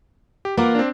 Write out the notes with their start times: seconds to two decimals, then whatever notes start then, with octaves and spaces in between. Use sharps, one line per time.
0.45 G4
0.57 A#3 F4 A#4 B4 F#5 D6
0.75 C4 D4